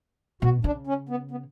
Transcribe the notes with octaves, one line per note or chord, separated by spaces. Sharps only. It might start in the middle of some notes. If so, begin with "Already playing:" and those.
B2 F#4
C#3 D4
C#4
B3
B3